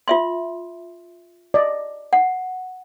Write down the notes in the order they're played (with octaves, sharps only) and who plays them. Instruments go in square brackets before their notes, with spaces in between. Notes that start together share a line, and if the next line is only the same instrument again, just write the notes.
[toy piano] F4 E5 C6
[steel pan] D5 D#5
[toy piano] F#5